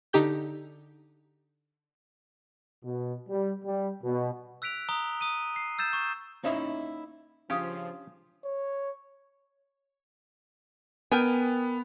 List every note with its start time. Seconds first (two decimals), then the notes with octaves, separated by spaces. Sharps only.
0.13 D3 D#4 G4 G6
2.84 B2
3.29 G3
3.65 G3
4.03 B2
4.62 E6 F#6 B6 D7 F7
4.89 A#5 D#6 G7
5.21 D#6 D#7
5.56 C7
5.78 E6 G6 A6 E7
5.93 C#6
6.44 A#3 C#4 D#4 E4 E5
7.50 C#3 F3 C#4 D4 F4 G4 D#6
8.45 C#5
11.12 B3 A#4 G5 G#5